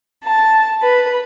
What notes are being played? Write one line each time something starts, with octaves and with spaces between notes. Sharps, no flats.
A5
B4